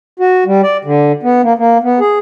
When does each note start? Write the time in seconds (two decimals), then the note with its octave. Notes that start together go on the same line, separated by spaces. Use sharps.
0.19 F#4
0.46 G3
0.64 D5
0.85 D3
1.23 B3
1.43 A#3
1.58 A#3
1.83 B3
2.00 G#4